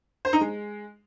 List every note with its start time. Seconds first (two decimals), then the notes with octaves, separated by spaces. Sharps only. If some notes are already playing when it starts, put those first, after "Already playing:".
0.25 C5
0.33 D#4
0.41 G#3